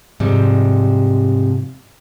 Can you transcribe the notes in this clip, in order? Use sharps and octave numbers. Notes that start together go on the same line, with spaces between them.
G#2 C3 F3 G3